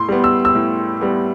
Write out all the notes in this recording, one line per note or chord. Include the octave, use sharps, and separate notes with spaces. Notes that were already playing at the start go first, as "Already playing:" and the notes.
Already playing: A2 C6
G3 B3
E6
E6
A2
G3 B3